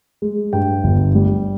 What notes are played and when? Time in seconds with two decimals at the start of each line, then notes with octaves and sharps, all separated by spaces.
0.22 G#3
0.53 G2 G5
0.84 G1
1.15 G3